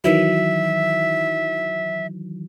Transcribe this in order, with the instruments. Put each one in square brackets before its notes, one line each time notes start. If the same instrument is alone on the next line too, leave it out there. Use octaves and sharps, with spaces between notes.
[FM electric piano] D#3 E3 F#3 [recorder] E5